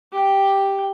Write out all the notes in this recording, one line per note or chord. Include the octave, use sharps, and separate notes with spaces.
G4 G5